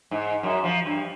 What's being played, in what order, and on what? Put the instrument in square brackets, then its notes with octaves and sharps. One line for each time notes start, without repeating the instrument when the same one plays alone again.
[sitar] G#2
F#2
F3
G2